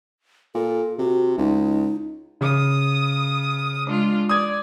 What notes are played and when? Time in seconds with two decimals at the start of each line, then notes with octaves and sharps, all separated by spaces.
0.55 A#2 A4
0.99 C3 F#4
1.38 C#2 D#4
2.41 C#3 D#6
3.86 G#3 D4 F4
4.29 D5 D#6 G#6